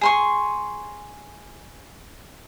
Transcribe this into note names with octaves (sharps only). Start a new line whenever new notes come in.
G#4 C6 C#6